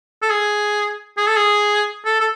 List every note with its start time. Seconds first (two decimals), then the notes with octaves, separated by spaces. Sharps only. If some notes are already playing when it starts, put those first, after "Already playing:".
0.22 A4
0.30 G#4
1.17 G#4
1.27 A4
1.36 G#4
2.05 A4
2.21 A4